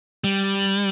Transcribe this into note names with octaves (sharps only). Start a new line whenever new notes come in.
G3